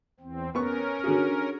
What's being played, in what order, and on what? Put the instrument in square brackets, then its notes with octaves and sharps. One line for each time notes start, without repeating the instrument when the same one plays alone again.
[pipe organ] E2 C4
[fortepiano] B3 C#6 [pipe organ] C#4 A#4
[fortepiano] D3 F#4 G#4